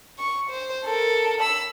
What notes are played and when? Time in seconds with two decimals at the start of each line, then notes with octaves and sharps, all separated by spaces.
0.19 C#6
0.50 C5
0.85 A4 A#4
1.41 B5 E6